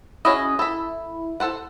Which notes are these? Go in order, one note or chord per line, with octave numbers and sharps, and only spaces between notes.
C#4 E4 F#4 G#4 D#5
E4 A4 B5
A4 C5 F#5